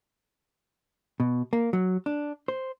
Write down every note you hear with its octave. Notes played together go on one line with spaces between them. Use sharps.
B2
A#3
F#3
D4
C5